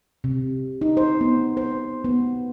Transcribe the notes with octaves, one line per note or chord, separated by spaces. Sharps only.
C3
D#4
C5
B3
C5
B3